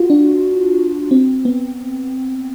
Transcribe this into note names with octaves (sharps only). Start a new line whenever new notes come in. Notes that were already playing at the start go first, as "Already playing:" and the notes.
Already playing: F4 F#4
D4
C4
B3